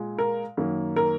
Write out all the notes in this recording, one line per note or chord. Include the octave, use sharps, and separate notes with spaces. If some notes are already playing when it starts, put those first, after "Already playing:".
Already playing: A#2 G#3
A#4
F#2 D#3 F#3 A#3
A#4